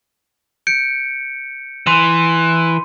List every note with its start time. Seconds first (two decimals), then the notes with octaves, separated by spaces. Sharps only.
0.67 G6 C#7 D7
1.87 E3 C6 D#7